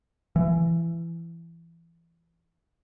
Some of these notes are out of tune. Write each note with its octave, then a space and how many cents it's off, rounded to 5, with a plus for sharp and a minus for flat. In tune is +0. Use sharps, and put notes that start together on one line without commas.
E3 +25